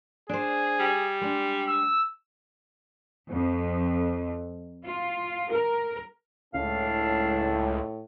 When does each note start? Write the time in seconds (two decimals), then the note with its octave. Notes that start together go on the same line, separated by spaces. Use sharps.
0.29 D4 G#4 C5
0.80 G3
1.21 G#3 D4
1.68 E6
3.31 F2
4.84 F4
5.49 A#4
6.54 C#2 A2 D4 E4 F5